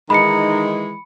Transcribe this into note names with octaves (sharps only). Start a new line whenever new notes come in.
D#3 E3 G#3 D#4 B5 C#7